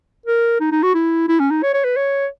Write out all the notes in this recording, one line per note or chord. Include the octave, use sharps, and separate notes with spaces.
A#4
D#4
D#4
F#4
E4
E4
C#4
D#4
C#5
C#5
B4
C#5